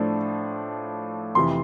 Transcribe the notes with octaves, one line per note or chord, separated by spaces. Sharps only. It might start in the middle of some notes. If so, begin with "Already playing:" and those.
Already playing: A2 F3 A3 D4
F2 C3 E3 C6